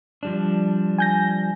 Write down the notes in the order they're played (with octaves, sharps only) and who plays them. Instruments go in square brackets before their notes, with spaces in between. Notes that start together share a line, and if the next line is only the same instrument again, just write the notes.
[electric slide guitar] F3 G3 D4
[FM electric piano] G#5 G6 A#6